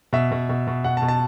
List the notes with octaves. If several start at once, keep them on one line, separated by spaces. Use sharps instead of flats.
B2 E5
B2
B2
B2
B2 F#5
A5
B2
A5